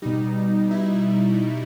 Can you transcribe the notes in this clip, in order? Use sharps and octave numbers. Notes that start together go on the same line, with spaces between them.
B2 G3 D#4
E4